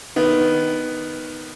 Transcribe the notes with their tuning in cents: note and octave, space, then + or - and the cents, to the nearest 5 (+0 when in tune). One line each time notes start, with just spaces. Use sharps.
D#3 +0 B3 +0